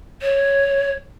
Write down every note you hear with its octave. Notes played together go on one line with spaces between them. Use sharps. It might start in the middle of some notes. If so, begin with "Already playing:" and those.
C#5